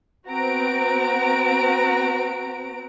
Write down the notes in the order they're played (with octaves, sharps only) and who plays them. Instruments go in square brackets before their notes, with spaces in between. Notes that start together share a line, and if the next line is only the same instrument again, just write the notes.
[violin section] B3 C4 F#4 A#5 D7